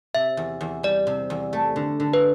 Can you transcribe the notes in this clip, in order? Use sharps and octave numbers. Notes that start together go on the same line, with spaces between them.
C3 E5
E2
E2
G3 D5
C3
E2
A3
D3
D3
B4